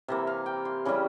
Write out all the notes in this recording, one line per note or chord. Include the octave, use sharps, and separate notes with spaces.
C3 E3 A#3 E5
F5
G5
C6
C#3 E3 G3 C#4